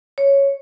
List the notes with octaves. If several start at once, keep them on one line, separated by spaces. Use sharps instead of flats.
C#5